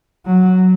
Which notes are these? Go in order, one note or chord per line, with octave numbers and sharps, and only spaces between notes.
F#3